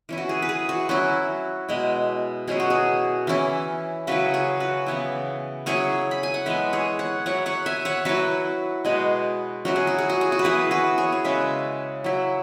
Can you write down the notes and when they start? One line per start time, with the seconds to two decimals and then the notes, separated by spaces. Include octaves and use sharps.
0.09 E3 C#4 E4
0.18 F#4
0.29 G#4
0.42 B4
0.49 G#4
0.69 F#4
0.89 F#3 C#4 E4 F#4
1.68 B2 G#3 E4
2.48 B2 F#3 C#4 E4 G#4
2.60 F#4
2.70 G#4
3.27 E3 C#4 E4
4.07 C#3 F#3 E4 F#4 B4
4.34 G#4 C#5
4.60 F#4 B4
4.86 C#3 E3 B3 E4
5.66 F#3 C#4 E4 G#4 C#5
6.11 B5
6.23 G#5
6.34 F#5
6.46 E3 G#3 B3 B4 E5
6.73 G#4 C#5
6.99 C#5 F#5
7.26 F#3 E4 C#5 F#5
7.46 C#5 F#5
7.66 E5 G#5
7.85 C#5 F#5
8.05 F#3 E4 F#4 B4
8.85 B2 G#3 B3 G#4
9.65 F#3 C#4 E4 F#4
9.76 G#4
9.87 F#4
9.98 G#4
10.10 F#4
10.21 G#4
10.32 F#4
10.39 B4
10.44 E3 B3 E4 G#4
10.71 F#4 B4
10.98 G#4 C#5
11.12 C#5
11.24 C#3 G#3 C#4 E4 B4 E5
12.04 F#3 E4